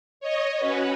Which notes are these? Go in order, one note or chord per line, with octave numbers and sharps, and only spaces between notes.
C#5 D#5
C#4 F#4 B4